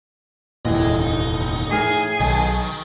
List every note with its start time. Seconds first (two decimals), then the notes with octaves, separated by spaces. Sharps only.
0.65 F1 D#2 A#2 E3 G#4 D#5
1.02 D#4
1.71 A2 G#4 A#4 F6
2.20 B1 D#3 D#5 A5